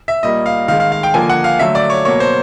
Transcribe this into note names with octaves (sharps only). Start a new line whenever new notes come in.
E5
A#2 G3 A#3 D#5
F5
D#3 G#3 F5
F5
F5
G5
D3 F3 A#3 G#5
F#5
F5
D3 F#3 A3 E5
D5
C#5
B2 F#3 A#3 C#5
C5